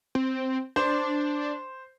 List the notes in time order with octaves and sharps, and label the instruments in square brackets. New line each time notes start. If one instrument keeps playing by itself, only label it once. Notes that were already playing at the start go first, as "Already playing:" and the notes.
[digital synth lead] C4
[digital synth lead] D4 [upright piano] C5